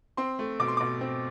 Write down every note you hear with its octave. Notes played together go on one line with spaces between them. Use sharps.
C4 C6
A3
B2 D6
C6
D6
B2
C4